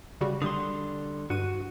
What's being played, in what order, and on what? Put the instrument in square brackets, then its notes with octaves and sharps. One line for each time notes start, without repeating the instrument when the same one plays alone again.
[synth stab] C#3 G3 F#4
[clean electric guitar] D3 G3 C6 [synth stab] D#6
[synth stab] G2 D#7 [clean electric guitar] F#4